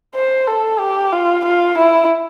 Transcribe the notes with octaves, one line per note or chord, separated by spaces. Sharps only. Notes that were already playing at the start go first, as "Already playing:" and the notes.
C5
A4
G4
F4
F4
E4